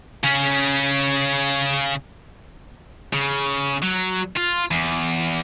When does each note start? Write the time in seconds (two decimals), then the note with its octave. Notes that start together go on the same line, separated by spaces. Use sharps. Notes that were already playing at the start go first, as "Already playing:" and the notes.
0.24 C#3 C#4
3.13 C#3
3.82 F#3
4.37 F4
4.71 E2